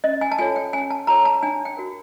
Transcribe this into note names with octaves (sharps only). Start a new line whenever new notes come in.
C#4 D#5
G#5
A5
F4 A4 C#5 G#5
G5
C#4 G#5
A5
F4 A4 C#5 A#5
A5
D4 G#5
G5
F#4 A#4